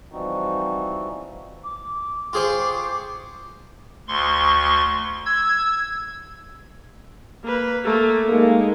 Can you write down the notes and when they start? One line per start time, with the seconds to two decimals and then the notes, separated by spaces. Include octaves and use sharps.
0.12 E3 F3 G3 C4 D#4 F#4
1.64 D6
2.33 F4 G#4 C5 G5 C#6 D6
4.08 D2 C6 C#6
5.26 E6 G#6
7.44 A#3 B4
7.84 A3 A#3
8.28 G#3 A#3 D#4